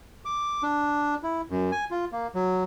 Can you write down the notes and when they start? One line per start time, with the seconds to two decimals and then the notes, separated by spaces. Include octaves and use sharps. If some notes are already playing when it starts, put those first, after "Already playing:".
0.25 D6
0.63 D4
1.23 E4
1.50 F#2
1.72 G#5
1.91 F4
2.12 A#3
2.35 F#3